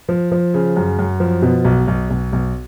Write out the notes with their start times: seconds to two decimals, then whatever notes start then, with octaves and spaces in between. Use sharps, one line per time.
0.09 F3
0.31 F3
0.54 C#3
0.76 F#2
0.99 F#2
1.20 F3
1.42 B2
1.65 B1
1.88 B1
2.10 B1
2.32 B1